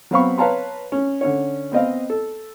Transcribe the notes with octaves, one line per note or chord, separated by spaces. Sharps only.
F#3 B3 C4 F5 B5 C#6
B4 C#5 F5 A5 A#5 C6
C#4
D3 C#4 C#5
B3 C4 D#5 F5
A4